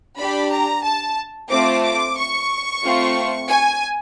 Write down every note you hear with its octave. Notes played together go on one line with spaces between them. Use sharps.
D4 G4 B5
A#5
A5
A3 C4 F4 D6
D6
C#6
A3 C4 F4
G#5